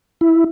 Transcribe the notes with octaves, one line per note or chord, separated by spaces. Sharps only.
E4